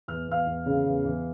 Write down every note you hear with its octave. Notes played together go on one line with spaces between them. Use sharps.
E2 F6
E2 F5 F6
E2
C#3
E2
E2